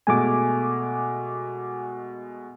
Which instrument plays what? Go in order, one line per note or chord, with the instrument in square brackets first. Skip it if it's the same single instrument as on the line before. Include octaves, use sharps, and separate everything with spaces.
[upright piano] B2 G#3 A3 [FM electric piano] G#5 D6